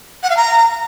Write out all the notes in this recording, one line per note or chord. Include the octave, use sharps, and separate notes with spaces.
F#5
F5
A#5